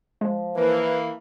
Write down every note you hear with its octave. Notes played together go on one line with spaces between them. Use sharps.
F3 G#3
E3 A#3 B4